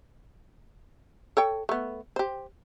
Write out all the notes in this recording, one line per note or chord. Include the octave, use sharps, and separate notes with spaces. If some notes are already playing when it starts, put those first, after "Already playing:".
A4 C#5 G5
A3 B3
G4 C5